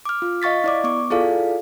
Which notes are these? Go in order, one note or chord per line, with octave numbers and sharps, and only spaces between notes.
D6 F6
F4
D#5 F5 C#6 A6 B6
E4 D5 D6
B3 C#6 D6
E4 F4 G#4 A4 D5 F5